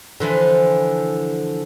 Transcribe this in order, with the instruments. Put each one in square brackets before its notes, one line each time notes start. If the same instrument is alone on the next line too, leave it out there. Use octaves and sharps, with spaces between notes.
[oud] D3 E3 F3